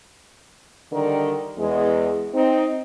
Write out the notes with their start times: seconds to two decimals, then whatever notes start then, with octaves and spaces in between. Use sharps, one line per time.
0.92 D3 D#3 G3 A#4
1.58 E2 G#3
2.34 C4 D#4